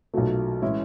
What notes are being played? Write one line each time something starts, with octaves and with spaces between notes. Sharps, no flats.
B1 A#2 F#3 A3
A2 E3 G#3 C#4 E4